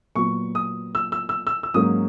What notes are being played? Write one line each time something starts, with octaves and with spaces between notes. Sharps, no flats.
A#2 F#3 B3 C#6
D#6
E6
E6
E6
E6
E6
G#2 F#3 A#3 C#4 D#6